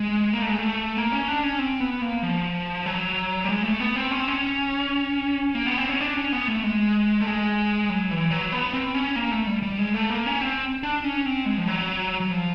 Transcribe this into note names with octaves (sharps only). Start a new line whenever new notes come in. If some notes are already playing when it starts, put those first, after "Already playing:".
Already playing: G#3
A#3
A3
G#3
A3
A#3
C#4
D4
C#4
C4
B3
A#3
F3
F#3
G3
G#3
A3
B3
C4
C#4
C4
C#4
A#3
B3
C4
C#4
D4
C#4
B3
A3
G#3
A3
G#3
F#3
E3
F#3
B3
C4
C#4
A#3
A3
G3
G3
G#3
A3
A#3
C#4
C4
D4
C#4
C4
G#3
F3
F#3
F#3
F3